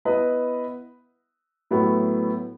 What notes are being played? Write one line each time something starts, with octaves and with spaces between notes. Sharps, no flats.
B3 E4 B4 D#5
A2 F#3 B3 E4